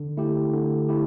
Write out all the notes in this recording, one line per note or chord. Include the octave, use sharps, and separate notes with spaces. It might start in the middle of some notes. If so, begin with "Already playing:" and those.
Already playing: D3
A3 E4 G4
D3
A3 E4 G4